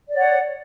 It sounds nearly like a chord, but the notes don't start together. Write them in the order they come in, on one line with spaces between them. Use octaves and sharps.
D5 C#5 F#5